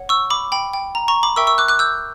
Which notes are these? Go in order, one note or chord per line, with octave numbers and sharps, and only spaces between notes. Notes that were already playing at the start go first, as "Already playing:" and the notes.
Already playing: C#5 F#5
C#6 E6
B5 D6
G5 B5
G5
A#5
A#5 C#6
B5 D6
A#4 E5 G5 C#6 E6
C#6 E6
D6 F#6
D6 F#6
E6 G6